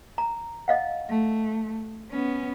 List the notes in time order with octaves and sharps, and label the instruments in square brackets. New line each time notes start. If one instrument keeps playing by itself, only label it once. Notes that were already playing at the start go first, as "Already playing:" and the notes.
[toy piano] A#5
D#5 F5 F#5
[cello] A3
B3 C#4